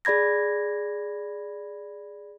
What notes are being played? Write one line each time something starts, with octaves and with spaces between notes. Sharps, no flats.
G#4 D5 B5 G#6 A#6